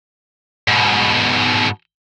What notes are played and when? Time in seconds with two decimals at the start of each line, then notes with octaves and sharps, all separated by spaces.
0.68 G#2 B2